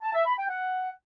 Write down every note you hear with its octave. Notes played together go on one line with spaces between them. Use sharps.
A5
E5
B5
G5
F#5